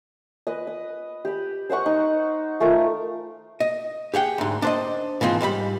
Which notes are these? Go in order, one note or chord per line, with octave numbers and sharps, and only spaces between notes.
B4 D#5
D#6
G4 B5
C5 D#5 F#5 C#6
D#4
A3 F4 A#4 A#5
D#5
G4 G#4 F#5 G5
D2 G#2
D4 C5 D#5
G#2 E3 F3 C4 F4
G#2 G3 D5 B5